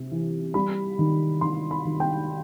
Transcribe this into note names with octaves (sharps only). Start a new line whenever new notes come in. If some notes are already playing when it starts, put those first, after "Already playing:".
Already playing: C3
E3
G3 B5
D#3
D#3 C6
B5
D#3
G5